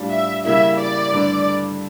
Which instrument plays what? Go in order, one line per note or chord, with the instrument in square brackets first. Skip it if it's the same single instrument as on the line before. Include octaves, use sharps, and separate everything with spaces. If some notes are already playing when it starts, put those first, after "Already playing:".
Already playing: [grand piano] A2 G3 D4 F4
[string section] E5
[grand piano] C#3 G3 A#3 E4 [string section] E5
[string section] D5
[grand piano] G2 D3 A3 D4